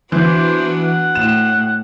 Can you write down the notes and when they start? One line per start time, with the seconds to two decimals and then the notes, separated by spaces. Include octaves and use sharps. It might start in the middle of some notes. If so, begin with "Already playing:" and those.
0.12 E3 B3 D4 F#4 C5
0.84 F#5
1.15 A2 E7